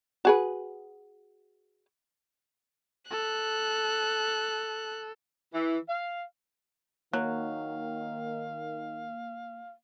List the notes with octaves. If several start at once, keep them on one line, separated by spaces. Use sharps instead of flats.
F#4 G#4 B4
A4 F#6
E3
F5
D#3 F#3 A#3 F5